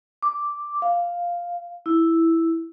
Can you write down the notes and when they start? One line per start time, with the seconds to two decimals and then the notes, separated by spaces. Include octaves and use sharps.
0.22 D6
0.82 F5
1.86 E4